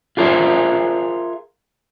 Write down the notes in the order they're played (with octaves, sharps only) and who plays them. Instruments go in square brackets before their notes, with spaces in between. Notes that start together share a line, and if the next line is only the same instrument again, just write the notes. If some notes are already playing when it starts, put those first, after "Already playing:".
[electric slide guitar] F4 G#4 A#4 C5 E5